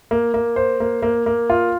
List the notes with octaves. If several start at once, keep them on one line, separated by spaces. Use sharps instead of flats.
A#3
A#3
C5
A#3
A#3
A#3
F4